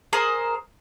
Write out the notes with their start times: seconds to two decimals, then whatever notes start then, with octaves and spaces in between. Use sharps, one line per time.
0.13 G#4 A#4 C5 D#6